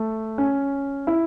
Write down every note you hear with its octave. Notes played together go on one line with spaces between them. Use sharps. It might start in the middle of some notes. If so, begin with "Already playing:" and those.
Already playing: A3
C#4
E4